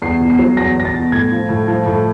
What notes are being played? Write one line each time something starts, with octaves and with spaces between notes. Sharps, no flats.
E2 C7
B2
C7
F#3
E2 A#6
E2 A#6
A6
B2
A2 G#6
F3
A2
F3
A2